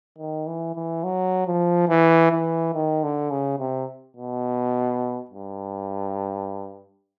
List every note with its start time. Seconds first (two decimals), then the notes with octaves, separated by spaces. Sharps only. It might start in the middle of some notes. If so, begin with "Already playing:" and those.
0.18 D#3
0.47 E3
0.75 E3
1.04 F#3
1.46 F3
1.88 E3
2.31 E3
2.74 D#3
3.03 D3
3.31 C#3
3.59 C3
4.17 B2
5.31 G2